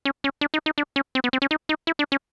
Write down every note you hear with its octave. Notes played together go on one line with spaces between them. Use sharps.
C#4
C#4
D4
D#4
D#4
D4
C#4
C4
B3
C4
C#4
D#4
D#4
E4
D4
C#4